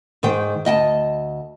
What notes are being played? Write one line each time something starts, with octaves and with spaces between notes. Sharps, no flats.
G#2 D#3 C5 G5
D2 D#5 G5 A5